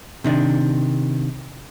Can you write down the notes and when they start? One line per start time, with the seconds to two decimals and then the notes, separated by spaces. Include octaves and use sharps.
0.24 C3 D#3 D4